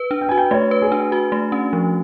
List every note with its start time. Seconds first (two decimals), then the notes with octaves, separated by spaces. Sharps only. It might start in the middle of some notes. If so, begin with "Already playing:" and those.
Already playing: B4
0.11 D4
0.21 G5
0.29 F#4 G#5
0.38 G5
0.51 A3 C#5
0.71 B4
0.82 G#4
0.92 D4
1.12 F#4
1.32 A3
1.52 C#4
1.73 F3